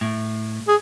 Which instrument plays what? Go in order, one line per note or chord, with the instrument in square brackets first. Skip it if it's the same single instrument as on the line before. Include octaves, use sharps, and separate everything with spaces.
[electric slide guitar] A2
[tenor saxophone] G#4